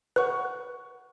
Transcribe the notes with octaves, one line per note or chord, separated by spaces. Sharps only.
B4 F#5 C#6 F#6